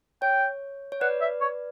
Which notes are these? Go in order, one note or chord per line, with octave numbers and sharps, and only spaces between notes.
C#5 G5
C#5
B4 D5 F#5
E5
C#5